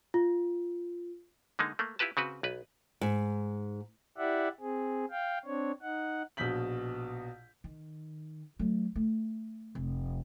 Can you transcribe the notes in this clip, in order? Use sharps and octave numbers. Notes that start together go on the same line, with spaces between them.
F4
D3 G#3 A#3 D#4
A3 A#3
E4 F4 G4 B4 A5
C#3 C4 F#4 B4
B1 B4
G#2
E4 G4 D5 E5 F#5
C4 G#4
F5 G5
C4 D4 C#5
D#4 F#5
A#1 B2 G6 B6 F#7
D#3
F#3 A3
A3
F1